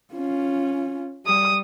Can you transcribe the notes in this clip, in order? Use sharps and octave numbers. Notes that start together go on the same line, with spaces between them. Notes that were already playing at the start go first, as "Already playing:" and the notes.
C#4 F4
G3 D#6